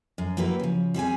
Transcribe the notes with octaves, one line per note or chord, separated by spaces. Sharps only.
F#2
F#3 A#3 E4 G4 B4
C#3 F3
G3 C4 G#4 G#5